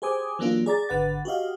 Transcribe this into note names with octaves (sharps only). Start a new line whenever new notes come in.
G4 G#4 C5 G#5 D6 D#6
E3 F#3 A#3 D4 F4
G#4 D5 A#5 A6
G#1 D3 B4 F#5 A6
F#4 G4 D#5 F5